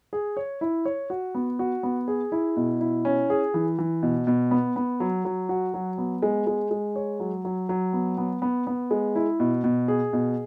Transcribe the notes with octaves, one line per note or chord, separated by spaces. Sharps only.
G#4
C#5
E4
C#5
F#4
B3
F#4
B3
G#4
E4
B2
E4
C#4
G#4
E3
E3
B2
B2
B3
B3
F#3
F#3
F#4
F#3
B3
G#3
G#3
G#3
C#5
F#3
F#3
F#3
B3
B3
B3
B3
G#3
E4
B2
B2
G#4
B2